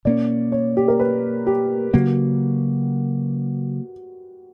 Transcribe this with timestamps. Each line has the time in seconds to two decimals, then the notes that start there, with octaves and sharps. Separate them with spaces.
0.05 B2 A#3 C#4 D5
0.52 C#5
0.77 G4
0.88 A#4
0.99 B4
1.47 G4
1.93 C#3 F#3 A#3 F#4